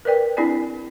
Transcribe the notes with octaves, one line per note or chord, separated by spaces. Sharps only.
A#4 B4 D5 G5
C4 D4 E4 G#4 D5 G#5